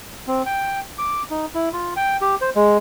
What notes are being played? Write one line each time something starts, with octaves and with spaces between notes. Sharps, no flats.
C4
G5
D6
D#4
E4
F4
G5
G4
C5
G#3